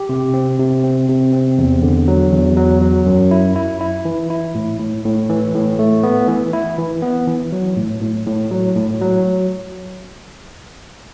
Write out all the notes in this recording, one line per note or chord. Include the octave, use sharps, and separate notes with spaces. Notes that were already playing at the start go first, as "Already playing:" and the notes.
Already playing: G4
C3
C4
C3
C4
C3
C4
E2
D3
F#3
E2
F#3
F#3
F#2
E4
E4
E4
E3
E4
A2
A2
A2
E3
A2
A3
B3
E3
E4
E3
B3
E3
F#3
A2
A2
A2
F#3
A2
F#3